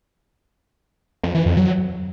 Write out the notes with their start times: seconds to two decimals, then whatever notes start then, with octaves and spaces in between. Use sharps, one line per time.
1.23 F2
1.35 E3
1.46 F2
1.57 F#3